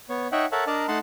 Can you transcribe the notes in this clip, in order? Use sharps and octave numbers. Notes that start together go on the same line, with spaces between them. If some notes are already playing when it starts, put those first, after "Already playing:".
B3 C#5
D#4 C#5 D#5 E5 F#5 G5
A4 A#4 C#5 E5 F#5 A5
D4 A#4 D5 D#5 A5 A#5
A3 D#4 D#5 F#5 A5 C6